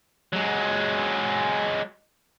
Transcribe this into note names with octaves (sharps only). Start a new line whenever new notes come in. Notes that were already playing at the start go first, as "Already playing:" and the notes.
F#3 G#3